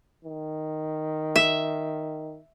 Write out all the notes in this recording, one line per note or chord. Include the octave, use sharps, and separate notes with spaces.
D#3
E5